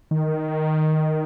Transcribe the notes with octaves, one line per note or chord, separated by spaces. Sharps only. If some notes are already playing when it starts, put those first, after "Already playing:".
D#3